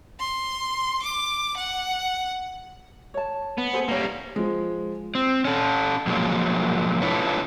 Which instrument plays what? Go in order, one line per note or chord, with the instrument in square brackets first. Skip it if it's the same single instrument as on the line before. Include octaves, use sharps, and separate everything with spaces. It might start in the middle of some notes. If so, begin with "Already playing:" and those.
[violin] C6
D6
F#5
[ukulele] C#5 A5
[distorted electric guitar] B3
[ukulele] G#4 A4 C5
[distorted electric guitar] G3 A#3 [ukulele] B4 C#5
[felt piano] F3 G#3
[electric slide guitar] C4
C#4 A4
B2 F3 F#3 G#3 A#3
D4 E4 F4 A4 B4 C#5